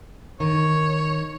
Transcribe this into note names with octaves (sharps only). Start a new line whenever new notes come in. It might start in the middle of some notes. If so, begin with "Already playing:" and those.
D#3 C#5